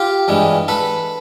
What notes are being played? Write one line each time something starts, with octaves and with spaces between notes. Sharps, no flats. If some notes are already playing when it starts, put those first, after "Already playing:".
Already playing: F4 G4
G2 E3 G#3
A4 B4